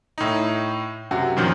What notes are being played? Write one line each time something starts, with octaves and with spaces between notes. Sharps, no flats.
A2 D#4
F#2 C3 F#4
F#2 A#2 D#3 F3